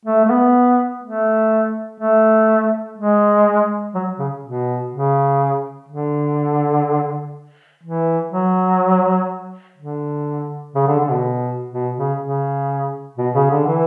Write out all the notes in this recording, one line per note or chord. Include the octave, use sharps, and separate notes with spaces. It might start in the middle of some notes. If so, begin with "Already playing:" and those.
A3
A3
B3
A3
A3
G#3
F#3
C#3
B2
C#3
D3
E3
F#3
D3
C#3
D3
D3
B2
B2
C#3
C#3
B2
C#3
D3
E3